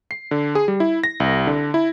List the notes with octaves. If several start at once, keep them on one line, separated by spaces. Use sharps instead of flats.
C7
D3
G#4
G3
E4
A#6
C2
D3
E4